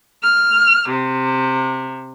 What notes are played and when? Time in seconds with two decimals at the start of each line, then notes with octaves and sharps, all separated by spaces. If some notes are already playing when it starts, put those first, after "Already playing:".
0.23 F6
0.89 C3